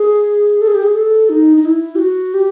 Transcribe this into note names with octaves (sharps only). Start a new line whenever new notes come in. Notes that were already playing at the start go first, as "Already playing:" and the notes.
Already playing: G#4
A4
G#4
G4
G#4
A4
D#4
D#4
E4
G4
F#4
G4